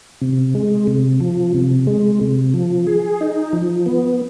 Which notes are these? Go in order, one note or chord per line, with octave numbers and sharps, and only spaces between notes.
C3
G#3
C3
F3
C3
G#3
C3
F3
G#4
D#4
F3
B3